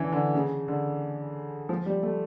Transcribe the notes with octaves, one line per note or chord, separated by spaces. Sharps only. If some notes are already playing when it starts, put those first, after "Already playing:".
Already playing: D3 E3 C#4
D3
C#3
D3
F3
G3
A3